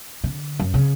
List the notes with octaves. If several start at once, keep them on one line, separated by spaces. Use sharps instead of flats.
D3
F#2
C#3